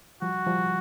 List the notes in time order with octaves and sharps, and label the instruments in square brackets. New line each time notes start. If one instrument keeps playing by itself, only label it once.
[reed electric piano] F3 G3 [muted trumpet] F#4
[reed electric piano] F3 G3